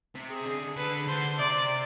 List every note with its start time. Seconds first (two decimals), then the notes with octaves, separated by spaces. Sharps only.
0.15 C3
0.31 G#4
0.46 D3
0.76 D3 B4
1.07 D3 C5
1.39 C3 D5